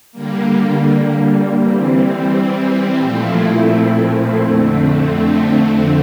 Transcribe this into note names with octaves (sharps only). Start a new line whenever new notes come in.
D3 G3 A#3
E3 G3 C4
A#2 F3 A3 C4 E4
F2 D3 A3 C4